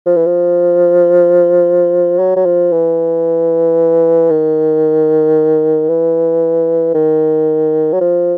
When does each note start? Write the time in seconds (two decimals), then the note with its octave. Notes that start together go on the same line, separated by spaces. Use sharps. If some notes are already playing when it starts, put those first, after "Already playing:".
0.06 F3
0.17 E3
0.27 F3
2.19 F#3
2.36 F#3
2.46 F3
2.72 E3
4.30 D#3
5.89 E3
6.94 D#3
7.93 F#3
8.01 F3